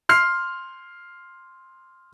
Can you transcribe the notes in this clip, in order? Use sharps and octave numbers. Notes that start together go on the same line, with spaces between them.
C6 F6 C7